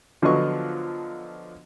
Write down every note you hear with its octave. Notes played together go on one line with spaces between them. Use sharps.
D3 F3 F#3 B3 D#5 C#6